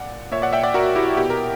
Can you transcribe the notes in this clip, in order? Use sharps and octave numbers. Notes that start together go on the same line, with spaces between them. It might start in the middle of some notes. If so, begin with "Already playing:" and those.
Already playing: A#2 D5 F#5
A#2 C#5 E5
D5 F#5
E5 G5
D5 F#5
F#4 A#4
E4 G4
B2 G4
A#4